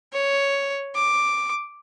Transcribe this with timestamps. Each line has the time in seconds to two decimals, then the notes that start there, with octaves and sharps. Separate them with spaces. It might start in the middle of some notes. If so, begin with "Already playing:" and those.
0.13 C#5
0.95 D6